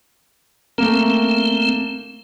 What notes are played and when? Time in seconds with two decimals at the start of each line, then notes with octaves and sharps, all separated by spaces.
0.78 A3 A#3 C4 A#4